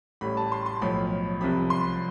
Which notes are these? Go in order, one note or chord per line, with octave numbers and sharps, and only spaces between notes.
A1 A2 G3 B5
A5
C6
C6
B1 A2 F3 B5
C2 C3 F3 B5
C6